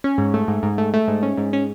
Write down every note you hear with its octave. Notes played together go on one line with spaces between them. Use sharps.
C#4
G#2
A3
G#2
G#2
A3
A3
G#2
C#4
G#2
C#4